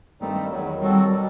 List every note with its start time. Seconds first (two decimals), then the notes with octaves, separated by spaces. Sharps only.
0.21 G2 D#3 G3 A3 C4 D#4
0.50 E2 D#3 F#3
0.80 D#3 F#3 G3 C4 F#4 A4
1.10 B2 G3